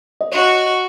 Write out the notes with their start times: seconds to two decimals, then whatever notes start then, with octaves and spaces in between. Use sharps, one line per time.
0.21 D#5
0.32 F#4 C#5